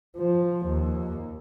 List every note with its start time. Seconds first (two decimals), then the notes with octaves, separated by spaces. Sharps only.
0.17 F3
0.67 D#2